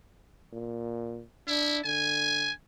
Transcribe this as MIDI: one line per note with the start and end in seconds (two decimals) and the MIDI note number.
0.53 1.23 46
1.47 1.79 62
1.47 1.79 64
1.85 2.51 50
1.85 2.52 80